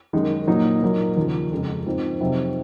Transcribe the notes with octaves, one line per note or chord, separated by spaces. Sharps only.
F#2 D#3 G#3 D#4
A#2 F#3 A#3 D#4
A#2 F#3 A#3 D#4
D#2 C#3 F3
F2 C#3 G#3
G#2 F3 C4 D#4
F2 C3 F#3 C4 D#4